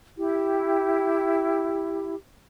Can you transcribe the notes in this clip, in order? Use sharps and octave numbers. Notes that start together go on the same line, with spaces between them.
E4 G4